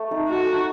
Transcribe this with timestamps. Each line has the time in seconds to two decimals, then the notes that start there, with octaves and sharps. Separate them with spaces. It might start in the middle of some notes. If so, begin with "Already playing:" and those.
Already playing: A3
0.11 D#4 A4
0.28 A3 F#4
0.46 D#4 A4